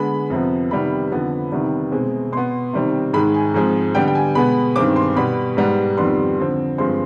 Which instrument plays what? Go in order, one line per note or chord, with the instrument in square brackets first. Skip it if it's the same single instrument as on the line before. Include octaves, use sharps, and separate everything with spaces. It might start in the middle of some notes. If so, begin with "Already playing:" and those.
Already playing: [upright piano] D3 G#3 B3 B5
F2 C3 F3 B3
C3 D#3 G3 B3 B5
F2 D3 F3 B3
C3 D#3 G3 B3
B2 G#3 C4
B2 B3 C6
C3 D#3 G3 C4
G#2 D#3 G#3 B5
G#5
G#2 F3 G#3 C4
D3 G3 B3 G5
G5
G#5
B2 G#3 B3 B5
G2 D#3 G#3 C4 D6
C6
B2 G3 B3 B5
G#2 G3 B3
F2 D#3 G3 B3 C6
D3 F3 C4
G2 F3 G#3 C4 C6